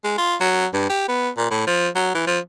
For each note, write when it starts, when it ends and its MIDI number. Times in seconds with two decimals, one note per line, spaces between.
0.04 0.17 56
0.18 0.36 65
0.40 0.66 54
0.74 0.88 43
0.89 1.04 67
1.08 1.29 59
1.37 1.46 46
1.51 1.65 45
1.67 1.89 53
1.95 2.11 54
2.14 2.25 52
2.27 2.39 53